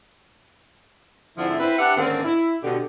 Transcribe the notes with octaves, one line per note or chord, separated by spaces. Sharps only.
G#2 D3 F3 C4 E4
C4 E4 B4
D4 G4 B4 E5 F#5
G#2 D3 D#3 A#3 C4 C#4
E4
B2 D3 G4